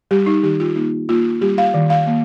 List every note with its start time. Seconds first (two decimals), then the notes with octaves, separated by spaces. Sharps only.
0.11 G3 G4
0.26 D#4
0.43 D#3 G4
0.60 F4
0.76 A#3 D#4
1.09 A#3 F4
1.41 G3 G4
1.58 F5
1.74 D#3
1.90 F5
2.07 A#3